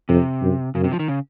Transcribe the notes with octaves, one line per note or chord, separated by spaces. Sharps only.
F2 C3
F#2
F#2 C#3
C3
F3
D#3
C#3